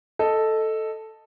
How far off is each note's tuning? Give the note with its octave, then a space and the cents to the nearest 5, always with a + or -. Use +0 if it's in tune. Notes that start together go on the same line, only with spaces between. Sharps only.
A4 +0 D#5 +0